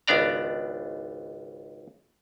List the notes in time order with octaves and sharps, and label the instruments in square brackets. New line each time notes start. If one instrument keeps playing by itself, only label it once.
[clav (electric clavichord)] G#1 C#2 B3 D4 D5 A#5